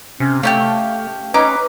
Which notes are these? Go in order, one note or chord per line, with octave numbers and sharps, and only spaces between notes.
C3 C#4
A3 C#4 D#4 G4 F5
C#4 D#4 B4 A#5 D6